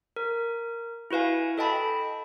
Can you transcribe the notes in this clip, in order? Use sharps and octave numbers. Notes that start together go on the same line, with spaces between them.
A#4
E4 F#4 B4 F5 G#5
A4 D#5 G5 A5 B5